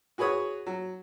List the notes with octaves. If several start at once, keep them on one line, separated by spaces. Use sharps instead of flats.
F#4 G#4 B4 C#5 D#6
F#3